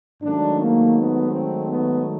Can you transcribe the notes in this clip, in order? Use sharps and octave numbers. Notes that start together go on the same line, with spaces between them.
G#2 D#3 F#3 A3 D4
A#3
B3
C4
B3